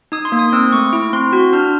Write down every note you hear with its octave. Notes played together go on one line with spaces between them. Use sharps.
D#4 D#6
C6
A#3
D#6
C4 E6
A3 C#6
E4
C4 C6
F#4
D4 F6